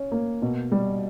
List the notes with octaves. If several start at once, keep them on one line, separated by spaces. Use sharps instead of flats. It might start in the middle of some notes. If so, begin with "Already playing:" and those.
Already playing: C#4
A#3
B2
G3